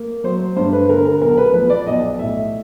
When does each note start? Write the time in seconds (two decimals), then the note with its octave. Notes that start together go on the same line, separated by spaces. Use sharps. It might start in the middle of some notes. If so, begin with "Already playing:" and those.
Already playing: A#3
0.24 F#3 C5
0.56 G2 C5
0.73 B4
0.89 D3 A#4
1.05 A#4
1.21 B1 A#4
1.37 B4
1.54 F3 B4
1.70 D5
1.87 B1 D#5
2.19 A2 E5